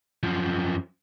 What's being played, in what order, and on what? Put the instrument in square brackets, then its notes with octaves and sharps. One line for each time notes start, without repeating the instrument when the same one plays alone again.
[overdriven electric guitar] F#2 F3